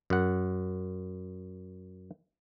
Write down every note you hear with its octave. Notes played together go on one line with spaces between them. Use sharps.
F#2 F#5